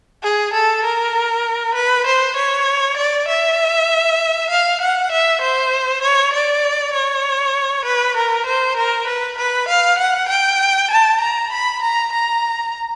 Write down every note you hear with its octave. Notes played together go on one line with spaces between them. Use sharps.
G#4
A4
A#4
B4
C5
C#5
D5
E5
F5
F#5
E5
C5
C#5
D5
C#5
B4
A#4
C5
A#4
B4
B4
F5
F#5
G5
A5
A#5
B5
A#5
A#5